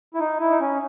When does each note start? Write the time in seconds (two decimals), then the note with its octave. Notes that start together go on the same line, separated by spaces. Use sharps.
0.14 E4
0.20 D#4
0.40 E4
0.50 D#4
0.60 C#4